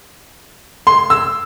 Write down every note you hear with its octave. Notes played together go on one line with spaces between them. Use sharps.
C6
E6